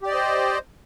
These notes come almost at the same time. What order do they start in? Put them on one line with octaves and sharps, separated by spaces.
G4 D5 D#5 C5